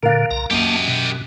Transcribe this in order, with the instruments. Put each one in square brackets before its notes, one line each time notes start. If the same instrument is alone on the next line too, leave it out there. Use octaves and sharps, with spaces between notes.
[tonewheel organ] A#2 D3 [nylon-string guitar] A#4 F5
[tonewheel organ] C2 A#5
[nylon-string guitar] F#2 [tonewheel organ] A#3 A5 [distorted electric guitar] G4 D#5
[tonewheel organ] B2